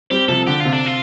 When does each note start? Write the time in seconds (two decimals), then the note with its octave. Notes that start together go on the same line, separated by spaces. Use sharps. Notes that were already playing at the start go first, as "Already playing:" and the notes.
0.10 G3 C4 G4
0.28 C3 F3 A4
0.47 D3 G4
0.60 C3 F4
0.73 D4
0.86 F4